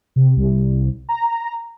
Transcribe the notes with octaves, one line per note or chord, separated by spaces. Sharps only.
C3
C2
A#5